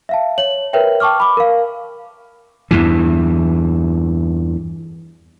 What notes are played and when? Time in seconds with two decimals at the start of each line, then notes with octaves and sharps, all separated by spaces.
0.09 E5 F5 A5
0.38 C#5 F#7
0.73 A#4 B4 C#5 E5 G5
1.00 G5 A5 C#6 D6 F6
1.20 B5 D6
1.37 A#4 F5
2.71 E2 G2 E3